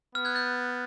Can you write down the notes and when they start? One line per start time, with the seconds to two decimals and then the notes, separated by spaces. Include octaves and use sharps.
0.15 B3 F6
0.25 F#6 G#6
0.35 G6 A6